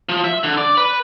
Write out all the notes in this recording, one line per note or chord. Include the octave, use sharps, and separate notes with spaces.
F3
E5
D3
D5
B4